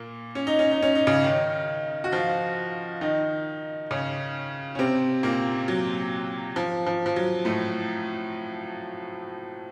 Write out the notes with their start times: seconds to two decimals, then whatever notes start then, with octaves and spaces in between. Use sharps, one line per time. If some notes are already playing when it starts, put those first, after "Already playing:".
Already playing: A#2 A#3
0.35 C#4
0.47 D#4
0.59 C#4
0.71 D#4
0.82 C#4
0.95 D#4
1.07 C#3 C#4
1.23 D#3 D#4
2.04 F#4
2.12 F3 F4
3.01 D#3 D#4
3.91 C#3 C#4
4.75 C#4
4.79 C3 C4
5.23 A#2 A#3
5.68 F#3
6.56 F3
6.87 F3
7.06 F3
7.16 F#3
7.45 A2 A3